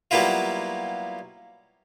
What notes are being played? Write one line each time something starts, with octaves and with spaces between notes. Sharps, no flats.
F#3 G3 A#3 B3 E4 F4